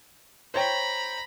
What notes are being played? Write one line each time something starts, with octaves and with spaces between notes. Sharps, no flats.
C5 C#5 G5 A#5 B5